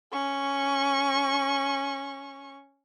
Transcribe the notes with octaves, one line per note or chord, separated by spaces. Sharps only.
C#4 C#6